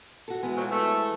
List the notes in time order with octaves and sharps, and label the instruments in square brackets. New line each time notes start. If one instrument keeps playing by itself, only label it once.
[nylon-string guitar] F#4 A4
E3 G#3 B3
[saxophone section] D3 F3 F#3
A3